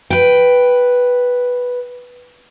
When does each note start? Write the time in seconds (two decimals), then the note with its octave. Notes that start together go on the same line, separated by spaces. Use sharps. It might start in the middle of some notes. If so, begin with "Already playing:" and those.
0.10 B4 G5